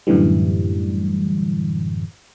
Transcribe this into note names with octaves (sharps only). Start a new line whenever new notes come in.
F#2 A2 D3 E3 G3